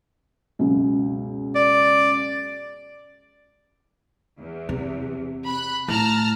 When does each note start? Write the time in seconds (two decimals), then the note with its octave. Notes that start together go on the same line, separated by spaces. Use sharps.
0.59 C#2 F#2 B2
1.55 D5
4.38 E2
4.69 C3
5.47 B5 F#6
5.88 A2 A5 A#5 F6